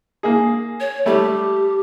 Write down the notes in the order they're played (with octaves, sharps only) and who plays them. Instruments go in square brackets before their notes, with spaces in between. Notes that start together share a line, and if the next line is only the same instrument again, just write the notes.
[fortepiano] A#3 G#4
[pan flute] C#5
[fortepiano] G3 A3 [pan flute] G4